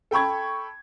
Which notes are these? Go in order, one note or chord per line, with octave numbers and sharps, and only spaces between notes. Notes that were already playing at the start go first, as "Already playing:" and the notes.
A4 G5 B5 C#6 G#6